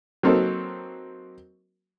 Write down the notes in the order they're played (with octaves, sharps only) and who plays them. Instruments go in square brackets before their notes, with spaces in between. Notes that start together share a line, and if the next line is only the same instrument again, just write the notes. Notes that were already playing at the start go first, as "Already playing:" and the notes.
[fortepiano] F#3 A#3 C4 D#4 A4